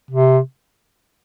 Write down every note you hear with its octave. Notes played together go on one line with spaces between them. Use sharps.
C3